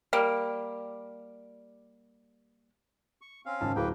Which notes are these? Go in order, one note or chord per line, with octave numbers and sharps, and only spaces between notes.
G3 A#3
C#6
C4 C#4 F5
G#1 C#3 A5
D1 A#3 G#4 B4 G5 A#5